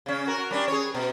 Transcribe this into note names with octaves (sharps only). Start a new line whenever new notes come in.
C#3 C#4
F#4 A#4
G3 C#4 D4
G#4 C#5
B2